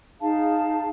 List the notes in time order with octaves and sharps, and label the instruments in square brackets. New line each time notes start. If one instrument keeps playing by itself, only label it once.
[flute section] D#4 G#4 F5 A5